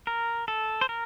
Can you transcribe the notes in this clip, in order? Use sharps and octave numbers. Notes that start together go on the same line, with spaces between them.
A#4
A4
C5
A#4